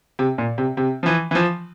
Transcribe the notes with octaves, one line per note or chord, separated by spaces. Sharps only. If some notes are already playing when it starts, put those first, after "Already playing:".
C3
A#2
C3
C3
F3
E3
E3
F3